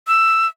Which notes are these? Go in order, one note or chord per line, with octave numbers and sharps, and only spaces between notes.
E6